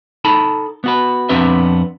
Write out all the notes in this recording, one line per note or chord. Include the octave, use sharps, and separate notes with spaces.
D#4 A4 A5 B5
B3 F#4 B4
F2 B3 C4 D4 B4 E5